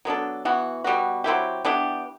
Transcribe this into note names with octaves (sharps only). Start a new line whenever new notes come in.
F#3 B3 D4 A4
E3 B3 F#4
B2 G3 B3 F#4
F#3 C4 E4 G4
E3 B3 D4 G4